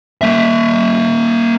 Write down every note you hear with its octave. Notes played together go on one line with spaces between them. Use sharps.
A#3 E5